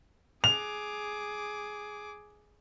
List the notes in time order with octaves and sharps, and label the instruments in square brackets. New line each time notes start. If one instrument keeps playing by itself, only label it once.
[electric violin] G#4 D6 [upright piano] F7